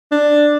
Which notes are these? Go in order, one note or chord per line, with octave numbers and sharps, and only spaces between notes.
D4